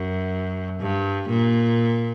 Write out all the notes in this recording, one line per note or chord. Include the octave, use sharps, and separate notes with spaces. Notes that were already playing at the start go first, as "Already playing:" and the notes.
Already playing: F#2
G2
A#2